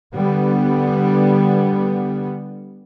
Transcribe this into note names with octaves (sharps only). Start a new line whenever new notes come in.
D3 G3 B3